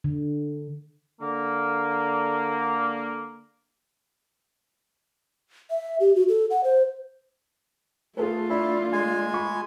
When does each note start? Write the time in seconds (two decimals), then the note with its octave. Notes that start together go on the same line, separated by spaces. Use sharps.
0.04 D3
1.20 D3 A#3
5.71 E5
6.00 G4
6.16 F#4
6.29 A4
6.50 F#5
6.64 C5
8.17 A3 F4 G#4 A4 B4
8.50 D4 E4
8.93 G#3 G#5
9.34 B5 C#6